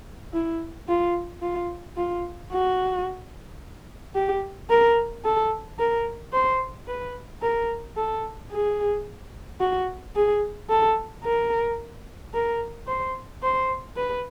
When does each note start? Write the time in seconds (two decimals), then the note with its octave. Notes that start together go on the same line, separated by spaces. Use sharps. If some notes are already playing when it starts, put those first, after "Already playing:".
0.33 E4
0.88 F4
1.42 F4
1.97 F4
2.52 F#4
4.15 G4
4.70 A#4
5.25 A4
5.79 A#4
6.33 C5
6.88 B4
7.42 A#4
7.97 A4
8.52 G#4
9.60 F#4
10.15 G#4
10.69 A4
11.24 A#4
12.34 A#4
12.87 C5
13.42 C5
13.96 B4